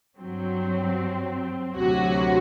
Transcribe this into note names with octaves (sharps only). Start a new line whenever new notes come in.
G2 F#3 C4
D2 C3 F#3 F#4